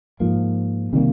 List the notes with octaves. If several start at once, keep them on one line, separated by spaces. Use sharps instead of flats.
G#2 F3 A#3
C3 D#3 G3 A#3